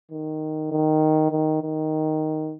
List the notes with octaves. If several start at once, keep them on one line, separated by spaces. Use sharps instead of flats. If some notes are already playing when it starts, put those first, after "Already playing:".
D#3
D#3
D#3
D#3